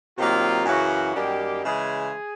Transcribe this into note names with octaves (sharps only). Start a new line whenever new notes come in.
C3 D#3 F#3 A#3 F4
F#2 C#3 E3 F#4
F#2 D#3 G3 A#3 G4
C#3 E3 G#3 G#4